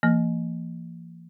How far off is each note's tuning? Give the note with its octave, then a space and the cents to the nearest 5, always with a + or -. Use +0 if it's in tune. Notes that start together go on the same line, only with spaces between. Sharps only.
E3 +45 A#3 -20